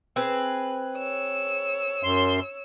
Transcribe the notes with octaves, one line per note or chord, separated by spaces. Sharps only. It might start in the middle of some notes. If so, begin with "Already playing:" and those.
C4 G#4 B4
C#5 E6
F#2 C6